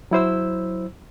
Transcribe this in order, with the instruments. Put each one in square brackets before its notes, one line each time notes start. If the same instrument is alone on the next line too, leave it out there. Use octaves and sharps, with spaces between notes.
[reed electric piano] F#3 E4 C5 E6